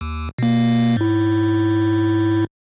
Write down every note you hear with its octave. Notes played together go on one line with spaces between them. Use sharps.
D#2
B2 A#3
G#2 E4